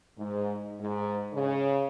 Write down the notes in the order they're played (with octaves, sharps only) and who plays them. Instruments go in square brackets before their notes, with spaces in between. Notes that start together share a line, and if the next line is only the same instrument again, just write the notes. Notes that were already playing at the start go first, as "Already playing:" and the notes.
[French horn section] G#2
G#2
C#3